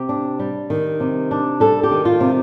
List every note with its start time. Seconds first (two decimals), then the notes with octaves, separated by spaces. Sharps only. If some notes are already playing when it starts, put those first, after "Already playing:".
Already playing: C3 G4
0.09 D4
0.39 G3
0.70 D#3
1.00 C3
1.31 D4
1.60 G3 A4
1.83 G4
1.91 D#3
2.05 F4
2.20 C3